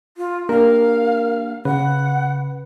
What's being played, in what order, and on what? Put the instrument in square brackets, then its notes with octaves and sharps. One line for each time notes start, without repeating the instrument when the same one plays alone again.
[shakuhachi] F4
[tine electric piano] A#3 D4 G4 [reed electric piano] A#4 [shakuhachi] F5
[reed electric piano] C#3 [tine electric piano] B4 [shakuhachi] F#5